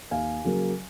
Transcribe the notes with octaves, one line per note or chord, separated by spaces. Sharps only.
D#2 F5 G#5
C#3 F#3 A#3